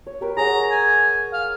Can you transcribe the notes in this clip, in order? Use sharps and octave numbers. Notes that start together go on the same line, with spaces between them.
C#5
G4 A#4 B4
G#4 C#5 F#5 A#5
G#5
F5